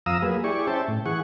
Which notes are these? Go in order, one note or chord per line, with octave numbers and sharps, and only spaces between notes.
F2 F5 A#5 D#6 E6
F#3 A#3 G#4 B4
E4 G4 G#4 D5 C#6
C#4 C5 E5 G5 A5
A2
E3 G#4 F#5 C#6